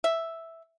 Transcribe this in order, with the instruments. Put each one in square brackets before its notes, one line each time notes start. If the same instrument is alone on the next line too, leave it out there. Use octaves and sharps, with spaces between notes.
[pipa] E5